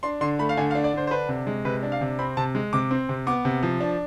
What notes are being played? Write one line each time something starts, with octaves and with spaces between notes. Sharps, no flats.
D4 C6
D3 C6
A3 B5
F5
D3 G#5
F5
D4
D5
D3 C5
C5
D4 B4
C3
G#3
C3 B4
D4
F5
C3
C4 B5
C3 A5
G#3
C3 D6
C4
C3
B3 D6
C3
F3
D4